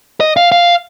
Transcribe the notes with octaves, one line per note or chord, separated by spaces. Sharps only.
D#5
F5
F5